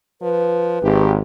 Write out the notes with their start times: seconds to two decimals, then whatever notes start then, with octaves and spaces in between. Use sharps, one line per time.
0.22 F3 B4
0.83 G#1 G4